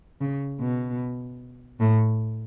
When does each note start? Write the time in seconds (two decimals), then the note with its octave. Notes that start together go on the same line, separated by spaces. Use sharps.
0.21 C#3
0.59 B2
1.80 A2